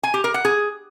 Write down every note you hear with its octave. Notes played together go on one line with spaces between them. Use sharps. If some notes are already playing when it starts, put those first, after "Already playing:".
G#5
G4
A#4
F#5
G#4